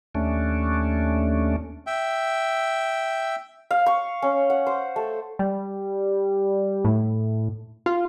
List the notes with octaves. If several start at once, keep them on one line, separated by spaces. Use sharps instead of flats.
D#2 A3 C#4 D4
E5 G5
F5
C#6
C#4
F#5
C5
A3
G3
A2
F4